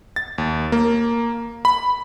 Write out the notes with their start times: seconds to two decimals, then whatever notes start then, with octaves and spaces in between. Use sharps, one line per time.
0.16 A6
0.38 D#2
0.72 A#3
1.65 B5